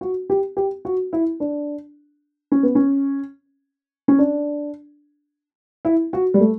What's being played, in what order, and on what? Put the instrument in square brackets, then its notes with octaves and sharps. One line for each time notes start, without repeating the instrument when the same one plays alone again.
[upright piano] F#4
G4
G4
F#4
E4
D4
C#4
B3
C#4
C#4
D4
E4
F#4
G3
A3